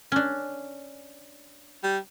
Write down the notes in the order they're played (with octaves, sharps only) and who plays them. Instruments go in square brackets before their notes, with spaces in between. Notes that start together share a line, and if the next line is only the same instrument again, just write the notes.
[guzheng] C#4 D4
[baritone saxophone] G3